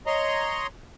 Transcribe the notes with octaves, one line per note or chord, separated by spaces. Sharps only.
C#5 D#5 A#5 C6